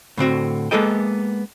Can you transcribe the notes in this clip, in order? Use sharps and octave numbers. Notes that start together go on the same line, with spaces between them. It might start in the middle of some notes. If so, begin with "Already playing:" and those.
A2 D3 C4 F#4
G#3 A#3 B3 A4 D#5 G5